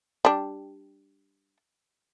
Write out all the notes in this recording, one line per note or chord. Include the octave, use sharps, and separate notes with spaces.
G3 D4